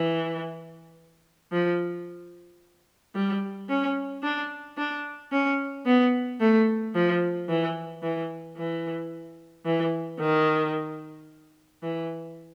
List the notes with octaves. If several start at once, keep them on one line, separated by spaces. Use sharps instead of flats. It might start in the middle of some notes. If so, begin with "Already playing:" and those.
Already playing: E3
F3
G3
C#4
D4
D4
C#4
B3
A3
F3
E3
E3
E3
E3
D#3
E3